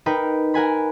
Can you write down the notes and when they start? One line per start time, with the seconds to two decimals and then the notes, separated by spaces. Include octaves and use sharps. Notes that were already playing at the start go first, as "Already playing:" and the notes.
0.06 D#4 A#4 B4 G5
0.54 A#4 F#5 G#5 B5